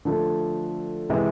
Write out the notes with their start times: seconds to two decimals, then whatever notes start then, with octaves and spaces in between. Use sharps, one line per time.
0.05 D3 F3 A3
1.10 C3 E3 G#3